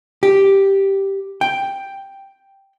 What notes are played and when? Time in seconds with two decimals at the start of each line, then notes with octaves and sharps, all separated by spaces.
0.23 G4
1.41 G5